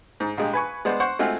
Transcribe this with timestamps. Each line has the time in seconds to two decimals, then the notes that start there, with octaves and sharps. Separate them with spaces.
0.20 G#2
0.37 A#1 G#3 G4
0.53 B4 G#5 C#6
0.85 G#3 B3 C5 D5
1.00 C5 F#5 C#6
1.19 G#3 A3 C4 F4 F#4 G#4